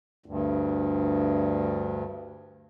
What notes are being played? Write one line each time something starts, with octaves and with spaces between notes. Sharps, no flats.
D2 G2